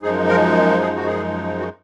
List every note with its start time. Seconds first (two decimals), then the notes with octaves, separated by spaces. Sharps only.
0.02 F#2 F3 G#3 D#4 G#4
0.28 A#4
0.81 G#4
0.96 F#4
1.07 G#4
1.59 F#4